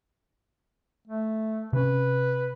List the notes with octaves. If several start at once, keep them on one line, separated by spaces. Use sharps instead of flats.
A3
C3 C#4 B4